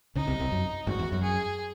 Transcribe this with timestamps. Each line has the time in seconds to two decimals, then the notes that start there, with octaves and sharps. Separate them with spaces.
0.15 C#2 C#3 D#4
0.27 C2 C3
0.40 C2 C3
0.52 F#2
0.87 G#1 G#2 F#4
0.99 E2
1.12 F#2
1.23 G#4